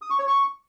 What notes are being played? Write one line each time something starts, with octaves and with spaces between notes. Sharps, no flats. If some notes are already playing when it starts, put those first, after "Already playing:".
D#6
C#6
C#5
C#6